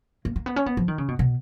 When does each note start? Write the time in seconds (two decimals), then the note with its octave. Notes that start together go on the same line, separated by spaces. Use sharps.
0.25 A#3
0.36 A#3
0.46 B3
0.56 C#4
0.66 B3
0.77 F3
0.88 D#3
0.98 C#3
1.08 B2
1.19 B2